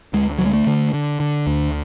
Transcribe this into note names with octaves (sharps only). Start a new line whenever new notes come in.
D2 G#3
D3 F#3
G#3
A3
D3
D3
D3
D2